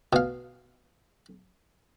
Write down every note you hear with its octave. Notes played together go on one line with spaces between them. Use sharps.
B2 F5